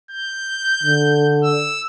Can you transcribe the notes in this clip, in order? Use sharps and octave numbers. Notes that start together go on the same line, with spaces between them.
G6
D3
E6